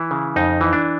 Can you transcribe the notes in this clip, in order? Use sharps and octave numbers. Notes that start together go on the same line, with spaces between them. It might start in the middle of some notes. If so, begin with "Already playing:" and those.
Already playing: E3 E4
C#3
F2 D#4
E3
D4